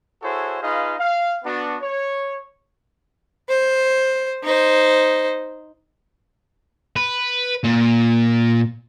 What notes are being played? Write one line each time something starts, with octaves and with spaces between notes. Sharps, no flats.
E4 F#4 G#4 A4 C5 C#5
D#4 F4 G#4 B4 D#5 F5
F5
B3 D4 F#4
C#5
C5
D#4 C5
B4
A#2